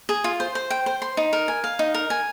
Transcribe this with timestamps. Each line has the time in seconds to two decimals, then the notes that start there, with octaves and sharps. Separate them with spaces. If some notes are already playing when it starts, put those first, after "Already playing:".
0.09 G#4
0.24 F4
0.40 C5
0.55 C5
0.70 G5
0.86 C5
1.02 C6
1.17 D#4
1.33 A#4
1.48 G#5
1.64 F5
1.79 D#4
1.94 A#4
2.10 G#5